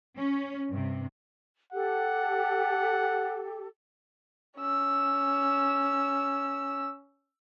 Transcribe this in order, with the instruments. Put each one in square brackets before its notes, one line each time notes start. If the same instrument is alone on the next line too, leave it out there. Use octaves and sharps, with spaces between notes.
[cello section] C#4
G2 C3
[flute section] G4 A4 [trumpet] F#5
[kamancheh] C#4 E6